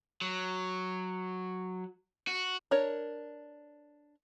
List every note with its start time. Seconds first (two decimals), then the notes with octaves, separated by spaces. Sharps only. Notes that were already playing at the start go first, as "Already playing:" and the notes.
0.21 F#3
2.27 F#4
2.71 D4 A#4 C#5